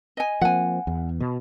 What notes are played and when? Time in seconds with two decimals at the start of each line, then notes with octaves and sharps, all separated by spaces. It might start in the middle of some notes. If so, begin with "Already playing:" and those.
0.17 D#5 G#5
0.41 F3 A#3 C4 F#5 G#5
0.87 E2
1.20 B2